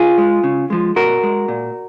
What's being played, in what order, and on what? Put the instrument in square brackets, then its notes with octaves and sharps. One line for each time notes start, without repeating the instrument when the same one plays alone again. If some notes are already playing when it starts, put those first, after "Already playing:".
Already playing: [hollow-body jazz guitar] F4 G#4
G#3
C#3
F3 G#3
B2 F#4 A#4
G#3
A#2